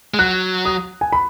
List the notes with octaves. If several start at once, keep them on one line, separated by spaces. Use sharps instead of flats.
G#3
F#3 F#6
D#6
G#5
B5